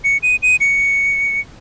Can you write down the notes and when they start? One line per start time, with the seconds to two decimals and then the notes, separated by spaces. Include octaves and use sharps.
0.04 C#7
0.23 D#7
0.43 D#7
0.61 C#7